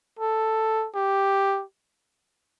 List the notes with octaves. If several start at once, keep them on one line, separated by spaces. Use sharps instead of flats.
A4
G4